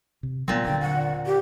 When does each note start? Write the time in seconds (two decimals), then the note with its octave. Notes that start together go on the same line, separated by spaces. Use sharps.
0.23 C3
0.48 A#2 F#3 G#3 B3 C4
0.64 D#1 D3 G5
0.81 F#5
1.26 G4